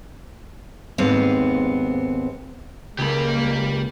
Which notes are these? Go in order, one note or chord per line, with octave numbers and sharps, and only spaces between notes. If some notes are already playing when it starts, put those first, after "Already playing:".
D#2 G#2 B3 C4 F5
C#2 G#3 A#3 G4 B5